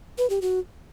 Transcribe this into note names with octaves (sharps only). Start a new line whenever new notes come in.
B4
G4
F#4